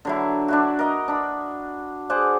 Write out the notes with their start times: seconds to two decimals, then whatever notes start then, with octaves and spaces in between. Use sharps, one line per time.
0.05 D3 F#3 E4
0.48 D4 E4 F#4
0.79 A#4 D#5
1.08 D4 B5
2.10 G#4 C5 D5 F#5